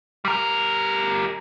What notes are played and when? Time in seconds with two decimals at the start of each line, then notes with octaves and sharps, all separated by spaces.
0.25 G3 A#4